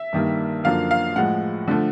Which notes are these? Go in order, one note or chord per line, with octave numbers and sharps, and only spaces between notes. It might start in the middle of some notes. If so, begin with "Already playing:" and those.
Already playing: E5
G2 D#3 G3 A#3
F#2 D3 F3 A#3 F5
F5
A2 F3 G#3 F#5
D3 F3 A3